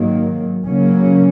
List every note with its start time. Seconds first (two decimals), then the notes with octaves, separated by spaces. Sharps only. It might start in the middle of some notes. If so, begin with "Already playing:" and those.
Already playing: G#2 D#3 F#3 A#3
0.64 C#3 F#3 A#3 C#4